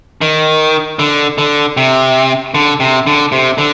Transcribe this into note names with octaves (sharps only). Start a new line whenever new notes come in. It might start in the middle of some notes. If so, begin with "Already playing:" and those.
D#3
D3
D3
C3
D3
C3
D3
C3
D3